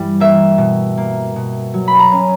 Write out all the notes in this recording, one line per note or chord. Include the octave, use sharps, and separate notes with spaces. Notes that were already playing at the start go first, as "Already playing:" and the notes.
Already playing: G2 E3 G3
A#3 E5
B2
A#3
B2
F#3
B5
A#5
C#4